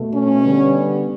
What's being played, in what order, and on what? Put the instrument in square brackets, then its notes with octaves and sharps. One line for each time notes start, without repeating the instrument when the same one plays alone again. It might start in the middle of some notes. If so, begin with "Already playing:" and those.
Already playing: [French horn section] B2 A3
C#4
D3 G3 B3